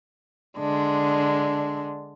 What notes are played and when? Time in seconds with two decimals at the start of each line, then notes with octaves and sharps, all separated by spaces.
0.58 D3 G#3 D4